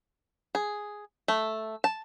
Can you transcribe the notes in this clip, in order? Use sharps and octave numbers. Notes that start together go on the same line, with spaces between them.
G#4
A3
A5